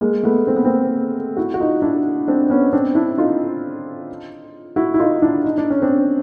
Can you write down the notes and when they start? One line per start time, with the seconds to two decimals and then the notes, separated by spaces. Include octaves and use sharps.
0.01 G#3 A#3
0.23 A3 B3
0.47 C4
0.56 B3
0.65 A#3 C4
1.37 E4 F#4
1.54 F#4
1.60 D#4 F4
1.82 D4 E4
2.28 C4 D4
2.50 B3 C#4
2.73 C4 D4
2.95 D4 E4
3.18 D#4 F4
4.76 E4 F#4
4.94 E4
4.99 D#4 F4
5.22 D4 E4
5.44 D#4
5.58 D4
5.70 C#4
5.82 C4 D4